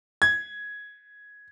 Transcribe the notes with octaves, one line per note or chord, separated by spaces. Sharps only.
G#6